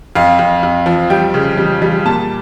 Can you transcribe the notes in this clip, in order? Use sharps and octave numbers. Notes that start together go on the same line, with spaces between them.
F2 F5
F2
F2
F3
G3 G5
C#3
G3
G3
A#2 A5